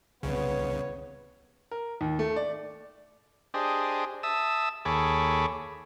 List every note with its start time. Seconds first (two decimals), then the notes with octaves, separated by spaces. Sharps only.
0.23 C2 C#3 B3 C#5
1.71 A#4
2.01 D#2
2.19 A3
2.36 D5
3.54 D4 G4 G#4 C5 D#5
4.23 E5 A5 D#6 E6
4.85 D#2 G#4 A4 C#5 B5 D6